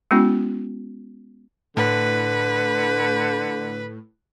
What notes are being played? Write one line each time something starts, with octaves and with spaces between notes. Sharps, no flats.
G#3 B3 C#4 E4 F#4
A2 D3 B4